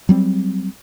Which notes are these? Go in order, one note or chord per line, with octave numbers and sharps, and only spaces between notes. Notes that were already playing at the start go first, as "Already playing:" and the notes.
F#3 G3 C4